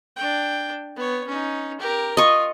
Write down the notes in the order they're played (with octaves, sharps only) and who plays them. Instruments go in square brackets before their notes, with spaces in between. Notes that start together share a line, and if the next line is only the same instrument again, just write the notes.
[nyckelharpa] D4 G5
B3 C#5
C#4 D#4
G4 A#4
[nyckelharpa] F4 [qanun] D#5 C#6